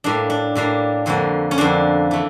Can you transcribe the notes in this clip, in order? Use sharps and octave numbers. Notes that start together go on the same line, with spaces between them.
A2 G3 A#3 D4
D4
A2 G3 A#3 D4
F2 D3 F3 A#3
C#4
F2 D3 F3 A#3 D4
E3 A3